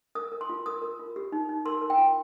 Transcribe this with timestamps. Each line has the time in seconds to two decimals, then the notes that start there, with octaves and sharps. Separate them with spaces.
0.15 A#4 D#6
0.32 A#4
0.41 C6
0.49 F4
0.66 A#4 D#6
0.82 A#4
0.99 F4
1.16 G4
1.32 D#4
1.49 D#4
1.65 A#4 C6
1.82 A#4
1.90 G5
1.98 F4